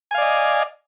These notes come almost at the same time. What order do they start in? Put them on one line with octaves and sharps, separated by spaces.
G#5 F5 D5 D#5